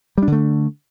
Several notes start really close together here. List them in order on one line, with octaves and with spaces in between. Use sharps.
G3 D4 D3 A3